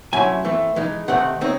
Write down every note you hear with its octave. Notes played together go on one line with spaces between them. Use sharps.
C3 F#3 A3 C#4 E4 G#5
E3 A3 C4
E3 G#3 D#4
C3 D#3 A3 C4 F#5
C#3 G#3 C4 D#4